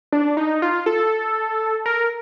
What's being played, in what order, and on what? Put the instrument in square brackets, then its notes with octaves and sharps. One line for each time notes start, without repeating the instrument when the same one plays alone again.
[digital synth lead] D4
D#4
F4
A4
A#4